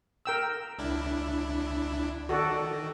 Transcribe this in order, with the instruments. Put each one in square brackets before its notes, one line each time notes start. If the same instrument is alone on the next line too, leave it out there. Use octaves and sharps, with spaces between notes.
[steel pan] A#4 G5 E6
[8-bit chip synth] C#2 D4 E4
[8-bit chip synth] D#3 [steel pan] F#4 A4 D5